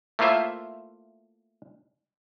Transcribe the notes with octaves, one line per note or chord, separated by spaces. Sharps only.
A3 A#3 E4 F4 C5 E5